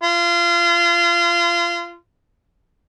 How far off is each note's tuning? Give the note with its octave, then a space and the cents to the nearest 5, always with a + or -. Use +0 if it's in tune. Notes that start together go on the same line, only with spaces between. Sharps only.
F4 -25